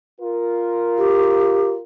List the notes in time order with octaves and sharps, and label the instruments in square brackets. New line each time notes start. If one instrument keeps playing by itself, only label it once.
[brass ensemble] F4 A#4
[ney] G4